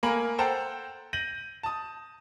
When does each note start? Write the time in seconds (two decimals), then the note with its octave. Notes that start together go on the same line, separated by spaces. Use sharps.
0.03 A3 A#3 A#4 G#5 B5 F#7
0.38 A4 C5 F#5 G5 A5 A#5
1.13 G6 A#6 D#7 F#7
1.63 A5 D#6